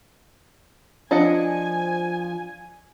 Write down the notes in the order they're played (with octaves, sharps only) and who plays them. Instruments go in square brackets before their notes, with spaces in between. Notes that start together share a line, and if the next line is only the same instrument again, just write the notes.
[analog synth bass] F3 [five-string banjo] D4 D#5 F#5 [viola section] G#5